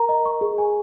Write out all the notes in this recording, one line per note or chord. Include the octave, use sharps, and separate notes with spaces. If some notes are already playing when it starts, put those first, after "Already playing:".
Already playing: A#4 A#5
D#5
C#6
G#4
G#5